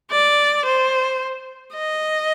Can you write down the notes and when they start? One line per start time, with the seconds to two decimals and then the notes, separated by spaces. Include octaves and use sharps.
0.11 D5
0.66 C5
1.74 D#5